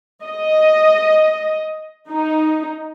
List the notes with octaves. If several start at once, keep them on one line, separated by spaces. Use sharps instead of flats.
D#5
D#4